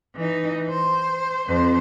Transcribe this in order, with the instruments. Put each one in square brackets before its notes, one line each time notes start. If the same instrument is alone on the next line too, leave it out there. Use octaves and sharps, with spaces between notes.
[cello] E3 D#4
C5
F2 C5